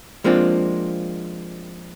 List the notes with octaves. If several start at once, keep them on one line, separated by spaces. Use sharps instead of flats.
F3 G#3 A#3 C4 D4 F4